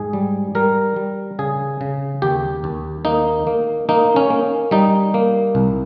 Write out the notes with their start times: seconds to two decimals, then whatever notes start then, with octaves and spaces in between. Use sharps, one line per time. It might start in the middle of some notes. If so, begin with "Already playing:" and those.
Already playing: G#2 G#4
0.13 G3
0.55 G3 A#4
0.96 G3
1.39 C#3 G#4
1.81 C#3
2.22 D#2 G4
2.64 D#2
3.05 A#3 D#4
3.47 A#3
3.89 A#3 D#4
4.16 C#4
4.30 A#3
4.71 G3 D#4
5.14 A#3
5.55 C2